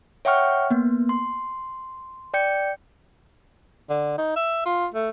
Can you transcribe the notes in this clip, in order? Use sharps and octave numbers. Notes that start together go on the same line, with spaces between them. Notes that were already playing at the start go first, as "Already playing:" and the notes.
C#5 E5 F#5 G5 C#6 F6
A#3 B3
C6
D5 G5 G6 C#7
D3
D#4
E5
F4
A3